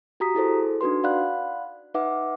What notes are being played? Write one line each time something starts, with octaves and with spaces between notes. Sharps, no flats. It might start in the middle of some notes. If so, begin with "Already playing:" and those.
F#4 G4 A#5 D#6 B6
E4 G#4 A4 C5
D4 D#4 F#4 B4 C6
D5 F5 F#5 B5 F#6
D#4 B4 E5 F#5 D6